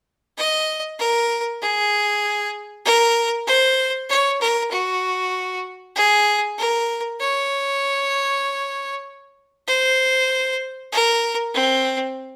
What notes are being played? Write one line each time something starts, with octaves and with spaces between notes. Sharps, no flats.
D#5
A#4
G#4
A#4
C5
C#5
A#4
F#4
G#4
A#4
C#5
C5
A#4
C4